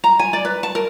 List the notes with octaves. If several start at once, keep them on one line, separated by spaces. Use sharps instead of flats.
A#5
G#5
D5
B4
A5
A#4